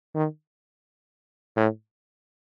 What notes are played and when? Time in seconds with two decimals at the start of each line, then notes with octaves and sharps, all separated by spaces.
0.15 D#3
1.57 A2